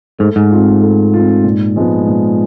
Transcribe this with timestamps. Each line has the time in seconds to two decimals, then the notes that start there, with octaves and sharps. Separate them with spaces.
0.19 G#2 A3
0.36 G#2
0.51 C4 F4
0.81 A3
1.14 C4 F4
1.44 A#2
1.76 F3 G#3 B3
2.07 A#2